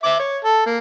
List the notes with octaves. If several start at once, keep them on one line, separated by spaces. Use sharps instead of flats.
E5 D6
C#5
A4
A#3